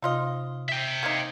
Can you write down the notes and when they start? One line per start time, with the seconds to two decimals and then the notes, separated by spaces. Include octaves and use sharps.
0.03 C3 D#4 F4 D#5
0.69 E5 G5
1.03 A#3 C4 D#4 G#6